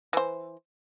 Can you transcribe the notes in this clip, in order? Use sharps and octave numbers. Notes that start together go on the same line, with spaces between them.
E3 C5